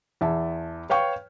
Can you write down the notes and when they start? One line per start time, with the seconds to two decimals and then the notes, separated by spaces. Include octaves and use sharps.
0.21 E2 E5 A5
0.89 B4 C#5 F5 G5 C#6